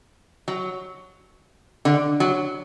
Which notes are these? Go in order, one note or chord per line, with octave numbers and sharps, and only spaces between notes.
F#3
D3
F#3